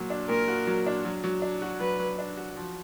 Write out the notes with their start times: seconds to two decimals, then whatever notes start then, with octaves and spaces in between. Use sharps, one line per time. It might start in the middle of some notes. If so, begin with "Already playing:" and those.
Already playing: A#2 F#3 F#4
0.10 D4
0.29 A#2 A#4
0.48 F#4
0.67 F#3
0.87 D4
1.05 F#3
1.24 F#3
1.42 D4
1.62 F#4
1.80 F#3 B4
1.99 F#3
2.19 D4
2.37 F#4
2.56 F3